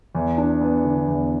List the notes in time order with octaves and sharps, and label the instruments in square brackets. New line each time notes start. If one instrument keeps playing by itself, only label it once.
[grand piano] E2
D4
B3
D3
E2